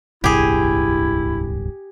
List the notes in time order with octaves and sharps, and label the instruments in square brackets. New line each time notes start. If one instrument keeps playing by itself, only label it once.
[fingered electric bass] D1 G1 C2 [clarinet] E4 [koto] G4 G#4